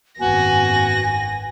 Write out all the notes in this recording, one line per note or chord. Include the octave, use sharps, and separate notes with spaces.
G#1 F#2 B3 F#4 G#5 A#6